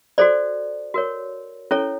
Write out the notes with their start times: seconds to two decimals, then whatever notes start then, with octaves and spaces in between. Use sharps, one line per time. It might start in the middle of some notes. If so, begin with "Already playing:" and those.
0.18 F#4 A4 C5 D5
0.94 F#4 A#4 C#5
1.71 C#4 E4 A4 C#5